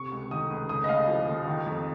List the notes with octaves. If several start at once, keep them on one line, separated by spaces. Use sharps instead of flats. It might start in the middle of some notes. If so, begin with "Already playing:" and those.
Already playing: C3 C#6
C#2
D#3 D#6
C#2
C#3 D#6
D#5
D#2 F5
F3
D#2
D#3
F2